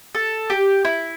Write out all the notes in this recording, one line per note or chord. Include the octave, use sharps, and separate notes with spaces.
A4
G4
E4